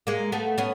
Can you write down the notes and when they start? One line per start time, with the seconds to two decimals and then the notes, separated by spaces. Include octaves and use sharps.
0.07 G#3 A#3
0.32 A3 B3
0.58 B3 C#4